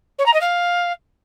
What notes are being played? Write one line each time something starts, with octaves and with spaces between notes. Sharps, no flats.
C#5
A#5
D#5
F5